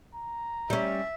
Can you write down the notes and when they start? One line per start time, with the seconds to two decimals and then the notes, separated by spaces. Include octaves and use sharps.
0.15 A#5
0.70 G3 C#4 E5